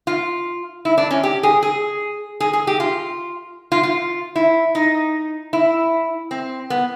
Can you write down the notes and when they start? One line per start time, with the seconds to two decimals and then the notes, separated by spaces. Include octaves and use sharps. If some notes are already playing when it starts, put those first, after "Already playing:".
0.07 F4
0.85 E4
0.98 D4
1.11 C#4
1.23 G4
1.43 G#4
1.63 G#4
2.40 G#4
2.53 G#4
2.67 G4
2.80 F4
3.72 F4
3.83 F4
4.35 E4
4.75 D#4
5.53 E4
6.31 C4
6.70 B3